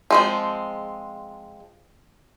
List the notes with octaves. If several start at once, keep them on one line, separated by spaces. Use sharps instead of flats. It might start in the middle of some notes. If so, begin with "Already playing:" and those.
F3 G#3 C4